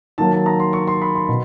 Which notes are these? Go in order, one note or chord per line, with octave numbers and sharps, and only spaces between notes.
D#3 F#3 A#3 A5
A5
A#5
C6
C#6
C6
B5
C6
B2